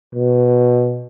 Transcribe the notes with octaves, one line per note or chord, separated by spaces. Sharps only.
B2